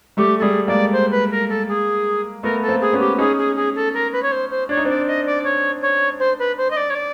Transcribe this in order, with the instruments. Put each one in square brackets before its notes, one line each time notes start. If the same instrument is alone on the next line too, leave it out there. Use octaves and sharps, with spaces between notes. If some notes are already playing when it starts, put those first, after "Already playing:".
[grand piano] G3 A3 [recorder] G4
[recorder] A4
[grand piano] G3 A3 [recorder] G#4
[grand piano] G#3 A#3 [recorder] D5
[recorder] C5
B4
A#4
A4
G#4
[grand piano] A3 B3 [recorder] A#4
[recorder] A4
[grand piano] A#3 C4
[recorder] G#4
[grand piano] B3 C#4
[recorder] G4
[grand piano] C#4 D#4 [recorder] G#4
[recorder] G#4
G#4
A4
A#4
B4
C#5
C5
C5
[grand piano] D4 [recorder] C#5
[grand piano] D#4
[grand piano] C4 D4 [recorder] D5
[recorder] D#5
D5
C#5
C#5
C5
B4
C5
D#5
D5
C#5
D5